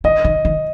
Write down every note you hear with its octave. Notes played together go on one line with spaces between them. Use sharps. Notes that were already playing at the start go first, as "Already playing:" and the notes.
D#3 D#5
D#3
D#3